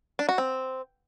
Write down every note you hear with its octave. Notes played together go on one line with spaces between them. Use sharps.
D4
F#4
C4